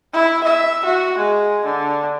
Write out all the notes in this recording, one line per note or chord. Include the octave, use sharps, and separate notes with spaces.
E4
E5
F#4
G#3
D3